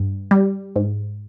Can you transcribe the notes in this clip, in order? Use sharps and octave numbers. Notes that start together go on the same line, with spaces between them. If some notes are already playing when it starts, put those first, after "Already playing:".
Already playing: G2
G3
G#2